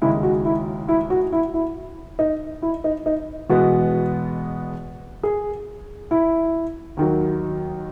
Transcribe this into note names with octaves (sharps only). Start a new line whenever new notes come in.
D#2 C#3 G#3 E4
F#4
E4
E4
F#4
E4
E4
D#4
E4
D#4
D#4
E2 B2 G#3 B3 F#4
G#4
E4
D#2 D#3 F#3